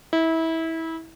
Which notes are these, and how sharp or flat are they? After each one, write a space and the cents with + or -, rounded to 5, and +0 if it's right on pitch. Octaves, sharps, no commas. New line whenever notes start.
E4 -25